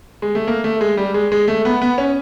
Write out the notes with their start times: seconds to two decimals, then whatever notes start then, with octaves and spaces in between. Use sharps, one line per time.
0.22 G#3
0.35 A3
0.47 A#3
0.64 A3
0.81 G#3
0.97 G3
1.14 G#3
1.32 G#3
1.48 A3
1.65 B3
1.82 B3
1.98 C#4